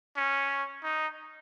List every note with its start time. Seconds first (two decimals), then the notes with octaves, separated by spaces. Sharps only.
0.17 C#4
0.84 D#4